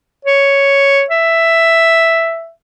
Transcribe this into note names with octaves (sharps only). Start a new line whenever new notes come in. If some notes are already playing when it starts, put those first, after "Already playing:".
C#5
E5